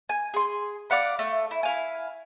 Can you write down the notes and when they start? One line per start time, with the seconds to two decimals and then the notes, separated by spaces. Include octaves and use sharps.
0.09 G#5
0.34 G#4 C6
0.90 D5 F5 F#5 B5
1.19 A3
1.51 E4
1.63 E4 F5 G#5